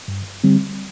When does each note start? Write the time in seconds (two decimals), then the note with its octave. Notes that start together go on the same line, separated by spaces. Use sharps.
0.08 G2
0.43 D3 G3 C4